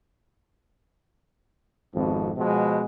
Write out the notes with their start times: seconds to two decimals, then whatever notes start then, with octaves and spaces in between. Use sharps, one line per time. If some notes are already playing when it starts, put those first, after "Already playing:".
1.94 G#1 F2 B2
2.37 B2 F3 G#3